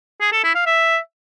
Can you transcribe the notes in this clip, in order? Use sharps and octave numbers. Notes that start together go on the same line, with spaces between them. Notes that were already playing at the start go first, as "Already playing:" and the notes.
G#4
A4
E4
F5
E5